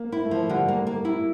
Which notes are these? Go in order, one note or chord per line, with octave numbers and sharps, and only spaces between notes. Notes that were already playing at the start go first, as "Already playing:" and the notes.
Already playing: A#3
E4
A3
F3
D3 G3
A#3
A#3
E4